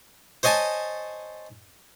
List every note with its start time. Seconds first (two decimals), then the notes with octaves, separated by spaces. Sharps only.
0.43 C5 C#5 D#5 G#5 A5